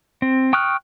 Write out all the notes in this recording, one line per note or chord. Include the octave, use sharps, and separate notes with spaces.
C4
G5 C#6 D#6 F6 F#6